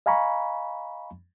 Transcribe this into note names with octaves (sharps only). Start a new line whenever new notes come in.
D#5 F5 G#5 A#5 B5 C#6